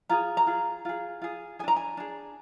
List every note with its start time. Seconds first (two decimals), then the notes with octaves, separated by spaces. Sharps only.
0.09 F4 G#4 A#5
0.37 A#5
0.47 F4 G#4
0.85 F4 G#4
1.22 F4 G#4
1.59 G#4 G#5
1.64 D4 A#5
1.76 G#5
1.97 D4 G#4